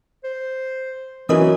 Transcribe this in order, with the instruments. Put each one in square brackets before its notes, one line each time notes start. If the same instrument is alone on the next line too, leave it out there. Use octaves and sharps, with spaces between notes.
[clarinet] C5
[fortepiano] E3 C#4 [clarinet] F#3 [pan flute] F#4 [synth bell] A#4 D#5 D#6